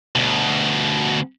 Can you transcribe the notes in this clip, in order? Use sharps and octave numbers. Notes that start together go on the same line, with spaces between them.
D2 B2